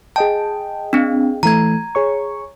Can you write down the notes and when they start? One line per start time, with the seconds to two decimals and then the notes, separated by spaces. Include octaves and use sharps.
0.16 G#4 D#5 G5 A5
0.93 C4 D4
1.43 E3 A3 A#5 G#6
1.95 G#4 C#5 C#6